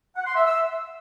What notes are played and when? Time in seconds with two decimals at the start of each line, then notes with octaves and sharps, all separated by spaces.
0.17 F#5
0.26 C6
0.36 E5
0.45 E6